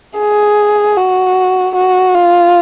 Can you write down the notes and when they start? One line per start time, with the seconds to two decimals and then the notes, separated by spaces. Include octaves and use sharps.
0.18 G#4
0.97 F#4
1.75 F#4
2.14 F4